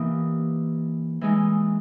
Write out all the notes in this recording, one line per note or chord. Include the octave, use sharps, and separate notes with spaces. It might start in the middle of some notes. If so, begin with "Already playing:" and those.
Already playing: E3 A#3 D#4 G4
E3 G#3 D#4